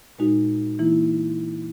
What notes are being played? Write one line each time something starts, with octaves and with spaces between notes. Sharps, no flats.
A#2 G#3 D#4 F#4
E3 A#3 E4